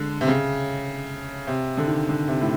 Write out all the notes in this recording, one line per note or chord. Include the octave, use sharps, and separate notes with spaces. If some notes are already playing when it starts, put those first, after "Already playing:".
Already playing: D3 G#3
C3
C#3
C3
D3
D#3
D3
C3
A2